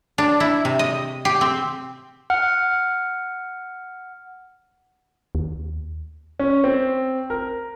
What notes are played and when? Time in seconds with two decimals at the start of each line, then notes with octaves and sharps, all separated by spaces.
0.18 D4
0.40 E4
0.65 C3
0.79 D#5
1.25 G4
1.41 C4
2.30 F#5 F6
5.35 D#2
6.39 C#4
6.64 C4
7.30 A#4